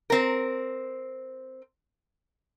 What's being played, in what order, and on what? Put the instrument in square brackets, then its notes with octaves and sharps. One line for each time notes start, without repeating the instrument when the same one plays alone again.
[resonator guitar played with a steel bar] C4 A#4